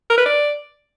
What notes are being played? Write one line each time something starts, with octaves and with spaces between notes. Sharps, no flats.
A#4
B4
D5